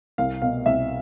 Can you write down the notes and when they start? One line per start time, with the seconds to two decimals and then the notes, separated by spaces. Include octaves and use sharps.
0.18 C2 F5
0.42 B2 F5
0.66 C2 E5